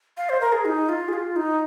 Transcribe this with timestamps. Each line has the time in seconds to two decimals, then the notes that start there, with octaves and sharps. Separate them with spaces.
0.17 F5
0.29 C5
0.41 A#4
0.53 G#4
0.65 D#4
0.89 F4
1.08 G#4
1.13 F4
1.36 D#4